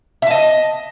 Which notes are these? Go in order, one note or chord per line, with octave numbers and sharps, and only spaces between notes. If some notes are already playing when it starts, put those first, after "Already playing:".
D#5 E5 A5